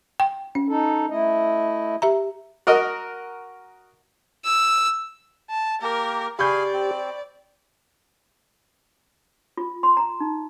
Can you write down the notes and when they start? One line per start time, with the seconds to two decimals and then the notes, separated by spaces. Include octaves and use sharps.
0.20 G5
0.55 C#4
0.68 D#4 A4
1.10 A3 E4 D#5
2.02 G4 E5 A#5
2.67 F#4 A#4 D#5
4.45 E6
5.50 A5
5.82 A#3 G4 A#4
6.39 G4 G#4 D5 F5 G#5 B5 C#6 G6
6.74 C4
9.57 F4
9.83 C6
9.97 A#5
10.20 D#4